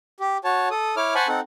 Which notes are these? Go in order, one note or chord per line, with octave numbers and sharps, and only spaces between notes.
G4
F#4 C#5 A5
A4 D#6
E4 C#5 D6 F6
C5 F#5 G#5 A5 B5 C#6
C4 D#4 A4 F#5